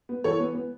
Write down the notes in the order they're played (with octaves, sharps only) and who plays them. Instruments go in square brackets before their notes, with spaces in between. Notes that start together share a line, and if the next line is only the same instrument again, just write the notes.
[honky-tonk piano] B3
E3 A4 C#5
B3
B3